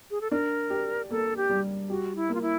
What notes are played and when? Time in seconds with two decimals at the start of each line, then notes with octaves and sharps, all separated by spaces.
0.11 G#4
0.21 A4
0.31 D4 A#4
0.70 G4
1.10 A#3 A4
1.37 G4
1.50 G3
1.89 F#4 G4
2.16 E4
2.29 A#3
2.34 F4
2.42 E4